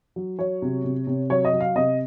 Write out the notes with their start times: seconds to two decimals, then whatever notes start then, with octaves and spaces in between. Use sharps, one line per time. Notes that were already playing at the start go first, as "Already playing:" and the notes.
0.16 F#3
0.39 F#3 C#5
0.62 C3
0.84 C3
1.07 C3
1.30 F#3 C#5
1.45 D#5
1.53 F#3
1.61 F5
1.75 C3 D#5